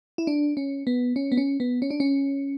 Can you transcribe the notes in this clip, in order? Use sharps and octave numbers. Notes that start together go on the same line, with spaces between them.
E4
D4
C#4
B3
C#4
B3
C#4
B3
C#4
D4
C#4